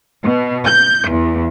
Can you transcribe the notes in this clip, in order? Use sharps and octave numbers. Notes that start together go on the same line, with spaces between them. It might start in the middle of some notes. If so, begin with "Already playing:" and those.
B2
G6
E2